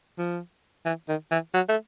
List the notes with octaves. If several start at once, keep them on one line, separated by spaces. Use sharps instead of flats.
F3
E3
D#3
E3
F#3
A3